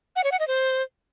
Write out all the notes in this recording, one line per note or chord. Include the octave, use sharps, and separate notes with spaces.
F#5
C#5
F#5
D#5
C5